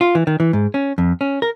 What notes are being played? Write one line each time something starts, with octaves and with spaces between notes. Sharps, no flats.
F4
E3
D#3
E3
G#2
C#4
F2
C#4
A#4